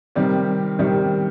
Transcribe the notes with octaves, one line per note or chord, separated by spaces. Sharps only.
C3 D#3 G3 C4 G4
C3 D#3 G3 C4 G4